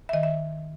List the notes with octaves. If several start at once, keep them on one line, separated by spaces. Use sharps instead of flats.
E5
D#3 D#5
E5